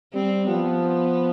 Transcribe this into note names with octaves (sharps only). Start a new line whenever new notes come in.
G3 C4
F3 B3